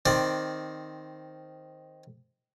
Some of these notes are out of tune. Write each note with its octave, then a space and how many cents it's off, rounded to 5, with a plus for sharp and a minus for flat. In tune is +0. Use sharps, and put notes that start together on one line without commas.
D#3 +0 C4 +0 D5 +10